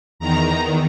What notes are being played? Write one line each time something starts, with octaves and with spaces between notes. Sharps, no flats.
E2 D#3 A#5